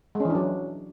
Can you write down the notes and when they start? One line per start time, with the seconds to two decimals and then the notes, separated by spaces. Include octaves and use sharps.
0.15 G#3
0.20 C#4
0.25 E3
0.30 D4
0.35 F#3